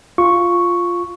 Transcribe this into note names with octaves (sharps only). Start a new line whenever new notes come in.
F4 C#6